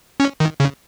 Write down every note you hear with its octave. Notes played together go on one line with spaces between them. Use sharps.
C#4
D#3
C#3